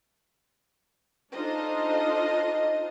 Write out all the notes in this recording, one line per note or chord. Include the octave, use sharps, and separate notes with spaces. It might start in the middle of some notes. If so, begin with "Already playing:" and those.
D4 D#4 F4 A4 C5 D#5